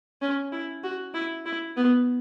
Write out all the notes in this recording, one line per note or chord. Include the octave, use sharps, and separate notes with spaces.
C#4
E4
F#4
E4
E4
B3